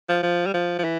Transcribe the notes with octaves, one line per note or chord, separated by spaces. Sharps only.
F3
F3
G3
F3
F3
E3